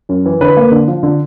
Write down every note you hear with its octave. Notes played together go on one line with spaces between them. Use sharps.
F#2
E3
D3 B4
A#3
D3
F3
D3